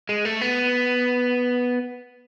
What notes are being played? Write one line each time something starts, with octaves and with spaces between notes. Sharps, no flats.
G#3
A3
B3